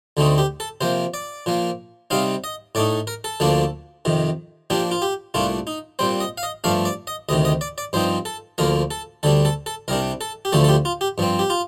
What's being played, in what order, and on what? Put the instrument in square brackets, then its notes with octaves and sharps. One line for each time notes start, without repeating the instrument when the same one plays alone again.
[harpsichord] D2 D3 A3 C4 D#4
G4
A4
C3 F3 A#3 C5
D5
A#2 F3 A#3
C3 G3 C4 D#4 F5
D#5
A2 A3 D#4 D5
A#4
A4
D2 D3 F3 A#3 D4
F2 C3 D#3
A#2 F3 A#3 D4 G4
F4
G4
C2 A#2 A3 D4 F4
D#4
A#2 G3 C4 C5
D#5
F5
D#5
G2 F3 A3 D4 F5
D5
D#5
D2 C3 D#3 D#5
D#5
D5
D5
G2 F3 C4 D#4 C5
A4
D2 D3 F3 A#3 A#4
A4
D2 D3 G3 D4 A4
A4
A4
C2 C3 G3 D4 A#4
A4
G4
D2 D3 F3 A3 A4
A4
G4
F4
G4
G2 F3 C4
G4
F4